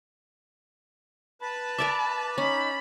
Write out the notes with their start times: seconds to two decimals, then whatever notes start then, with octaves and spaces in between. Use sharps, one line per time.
1.42 B4 A5 B5
1.78 A#4 D5 E5 D6 A6
2.38 C#4 D#4 B5